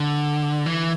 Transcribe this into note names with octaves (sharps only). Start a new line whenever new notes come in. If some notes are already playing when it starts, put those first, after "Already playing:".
Already playing: D3
E3